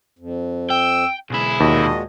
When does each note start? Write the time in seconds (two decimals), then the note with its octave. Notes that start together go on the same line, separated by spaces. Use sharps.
0.19 F2
0.70 G5 E6
1.31 B1 E4 G#4
1.60 D#2 A#2 G#3 F#4 D#5